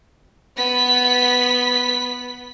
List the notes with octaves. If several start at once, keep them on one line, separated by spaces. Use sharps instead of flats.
B3 B6